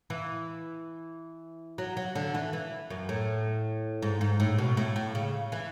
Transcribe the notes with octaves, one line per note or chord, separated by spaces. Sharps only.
E3
F#3
F#3
D3
E3
E3
F#2
A2
G#2
G#2
A2
B2
A2
A2
C#3
E3